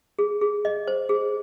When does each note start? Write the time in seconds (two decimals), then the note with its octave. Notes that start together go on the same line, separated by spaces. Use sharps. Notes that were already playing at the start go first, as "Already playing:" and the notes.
0.19 G#4
0.41 G#4
0.65 D#5
0.87 C5
1.09 G#4